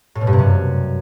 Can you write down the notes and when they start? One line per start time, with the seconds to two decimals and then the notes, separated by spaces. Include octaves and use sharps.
0.15 A2
0.21 B2
0.27 G2
0.33 C3
0.39 F#2